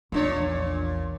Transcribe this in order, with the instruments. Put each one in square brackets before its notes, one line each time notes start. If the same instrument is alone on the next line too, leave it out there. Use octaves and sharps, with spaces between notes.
[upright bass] A#1 E2 [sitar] A#2 D4 C#5
[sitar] A#2